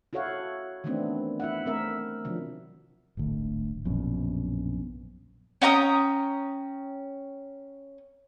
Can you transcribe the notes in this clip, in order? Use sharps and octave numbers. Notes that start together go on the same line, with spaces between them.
E4 F#4 A4 C#5 F5 F#5
D#3 E3 A3 B3 C4 D4
E4 E5 F#5
A3 C4 A#4 E5
C3 D#3 F3 F#3 D4
D1 G#1 D2
A#1 F#2 B2
C#4 G5 A#5 D#6